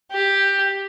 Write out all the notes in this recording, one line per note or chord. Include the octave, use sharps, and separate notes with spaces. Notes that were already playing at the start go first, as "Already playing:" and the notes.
G4